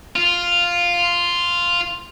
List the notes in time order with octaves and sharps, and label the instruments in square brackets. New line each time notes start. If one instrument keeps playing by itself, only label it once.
[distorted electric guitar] F4